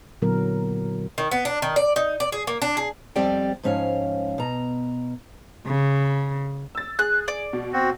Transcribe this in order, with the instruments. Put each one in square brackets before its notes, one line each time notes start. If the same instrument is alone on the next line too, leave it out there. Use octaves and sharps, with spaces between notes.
[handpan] A#2 D3 F#3 B3 E4 A#4
[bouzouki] D#3
B3
D4
D#3
D5
D#4
D5
G#4
A#3
D4
G#4
[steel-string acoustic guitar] F2 G3 C4 G4 D5 G5
G#2 F3 C#4 C#5 F5
B2 A#5
[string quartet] C#3
[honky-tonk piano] E6 A6
[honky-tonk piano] G#4 [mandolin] F#6
[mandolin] D5
[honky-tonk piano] B2
[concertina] C4 F#4